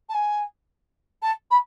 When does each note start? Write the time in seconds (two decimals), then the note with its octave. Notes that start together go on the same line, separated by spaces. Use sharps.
0.09 A5
0.14 G#5
1.22 A5
1.51 B5